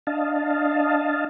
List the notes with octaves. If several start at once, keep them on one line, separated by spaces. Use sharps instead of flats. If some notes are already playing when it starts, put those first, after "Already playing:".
D4 D#5 F5 A5